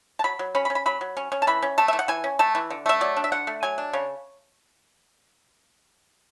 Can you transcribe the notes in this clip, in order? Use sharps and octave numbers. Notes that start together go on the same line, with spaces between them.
A5
F#3 B5
F#3
C#4 B5
B5
C#4
B5
F#3 B5
F#3
C#4
C#4
A5
E3 B5
C#4
A3 A5
E5
E3
F#5
E3 G#5
C#4
A3 A5
E3
D3
A3 E5
F#3 D5
D4
E5
D3 F#5
A3
F#3 G#5
D4
C#3 C#5